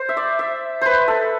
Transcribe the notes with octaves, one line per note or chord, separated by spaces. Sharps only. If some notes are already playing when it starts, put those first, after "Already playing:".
Already playing: C5
E5
D5
E5
B4 C5
A4